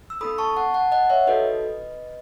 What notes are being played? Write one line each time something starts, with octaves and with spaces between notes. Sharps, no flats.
E6
B3 D#4 A4 B5 D#6
A5 C#6
F#5 A5
F#5 A5
D#5 F#5
C#5 E5
D#4 F#4 A4 B4 D#5